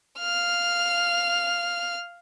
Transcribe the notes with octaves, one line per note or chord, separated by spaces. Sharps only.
F5 F6